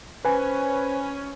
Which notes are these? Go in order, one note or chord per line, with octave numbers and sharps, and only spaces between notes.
C#4 B4 C5 G#5